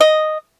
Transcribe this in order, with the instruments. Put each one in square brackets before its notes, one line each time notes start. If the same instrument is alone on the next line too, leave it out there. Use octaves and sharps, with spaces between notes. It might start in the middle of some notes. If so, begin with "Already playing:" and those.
[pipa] D#5